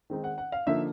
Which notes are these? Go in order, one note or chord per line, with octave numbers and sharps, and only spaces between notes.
D#3 G#3 C4 D#4
F#5
F#5
F5
D3 F3 A#3 D#4 E5